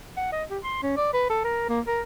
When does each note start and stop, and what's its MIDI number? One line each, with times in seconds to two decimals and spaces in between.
0.17 0.29 78
0.32 0.44 75
0.50 0.59 67
0.64 0.78 84
0.83 0.94 61
0.97 1.10 74
1.14 1.29 71
1.30 1.44 69
1.44 1.66 70
1.69 1.81 58
1.87 2.02 70